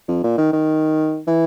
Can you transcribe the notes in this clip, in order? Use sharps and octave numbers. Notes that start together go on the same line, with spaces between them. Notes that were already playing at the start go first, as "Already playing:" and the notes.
F2
A#2
D#3
D#3
E3